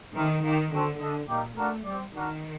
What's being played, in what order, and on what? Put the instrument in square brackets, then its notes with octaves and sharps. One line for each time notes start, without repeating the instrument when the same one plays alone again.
[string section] D#3 [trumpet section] A3 C4 G4 A#4
[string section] D#3 [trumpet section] A#3 D#4 G4
[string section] D3 [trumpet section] C4 F#4 A4 C5
[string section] D3 [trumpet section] D4 A4 D#5
[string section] A#2 [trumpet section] G3 A#3 D#4 G4
[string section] A3 [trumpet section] A#3 D4 F#4 A#4
[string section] G3 [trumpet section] C4 G4 D5
[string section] D#3 [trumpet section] D4 F#4 A#4